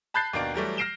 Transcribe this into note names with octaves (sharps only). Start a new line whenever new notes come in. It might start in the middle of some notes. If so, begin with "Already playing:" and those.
A5 B5 F#6 G6 A6 C7
D#2 B2 A#3 D4 D7
E3 F#3 G3 A3
F6 A#6 C7 D7 E7 G7